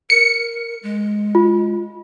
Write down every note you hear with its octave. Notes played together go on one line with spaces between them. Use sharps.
A#4 C#7
G#3
F4